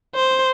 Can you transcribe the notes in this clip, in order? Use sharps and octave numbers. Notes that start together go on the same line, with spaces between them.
C5